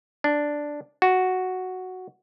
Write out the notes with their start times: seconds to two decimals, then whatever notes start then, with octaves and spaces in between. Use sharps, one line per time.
0.24 D4
1.02 F#4